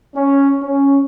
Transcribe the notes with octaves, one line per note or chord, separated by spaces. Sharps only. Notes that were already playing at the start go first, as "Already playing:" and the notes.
C#4
C#4